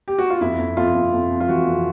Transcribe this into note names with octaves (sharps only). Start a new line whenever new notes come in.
G4
F#4
F4
F2 E4
F2
F2 F4
F2
F2
F2
F4
E3 F#4
F2